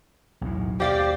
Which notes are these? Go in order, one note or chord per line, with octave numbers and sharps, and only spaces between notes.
B1 E2 A2
D#2 G4 C5 D5 F5 G5